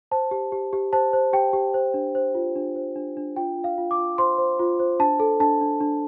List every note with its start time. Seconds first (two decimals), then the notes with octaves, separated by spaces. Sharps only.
0.11 C5 A5
0.31 G4
0.52 G4
0.73 G4
0.93 C5 A5
1.13 C5
1.33 G4 G5
1.53 G4
1.74 C5
1.94 D4
2.15 C5
2.35 F4
2.56 D4
2.76 C5
2.96 D4
3.17 D4
3.36 F4 G5
3.57 F4
3.64 F5
3.78 F4
3.91 D6
3.97 F4
4.18 C5 C6
4.38 C5
4.59 F4
4.79 C5
4.99 D4 A5
5.20 A4
5.40 D4 A5
5.61 D4
5.81 D4